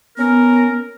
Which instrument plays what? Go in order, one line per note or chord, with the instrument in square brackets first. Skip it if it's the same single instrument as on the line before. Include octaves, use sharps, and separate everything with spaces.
[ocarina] B3 [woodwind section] C#4 A#4